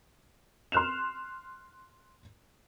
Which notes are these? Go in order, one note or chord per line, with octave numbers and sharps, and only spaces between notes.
C6 F6 F#6 E7 F7